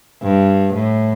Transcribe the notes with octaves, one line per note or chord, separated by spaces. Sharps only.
G2
A2